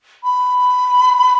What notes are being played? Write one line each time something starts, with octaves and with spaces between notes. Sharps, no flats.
B5